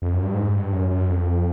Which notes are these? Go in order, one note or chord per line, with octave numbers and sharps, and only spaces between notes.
F2
F#2
G2
G#2
G2
F#2
F#2
F2